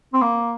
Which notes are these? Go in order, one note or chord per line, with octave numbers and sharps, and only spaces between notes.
C4
A#3